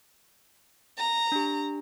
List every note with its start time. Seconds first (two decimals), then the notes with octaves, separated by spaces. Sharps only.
0.98 A#5
1.32 D4 G4